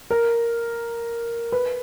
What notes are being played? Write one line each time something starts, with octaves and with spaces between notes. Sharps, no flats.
A#4
B4